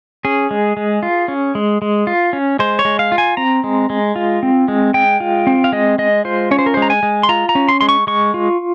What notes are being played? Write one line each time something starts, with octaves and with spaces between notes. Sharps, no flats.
C#4 G#4
G#3
G#3
F4
C#4
G#3
G#3
F4
C#4
G#3 C5
C#5
G#3
F5
F4
G#5
C4 A#5
G#3
G#3
F4
C4
G#3
G#3 G5
F4
C4
F5
G#3 D#5
G#3 D#5
F4 C5
C#4 C#5
C5
A#4
G#3 C5
A#5
G#5
G#3
C6
F4 A#5
A#5
C#4
C6
G#3 C6
C#6
G#3 C#6
F4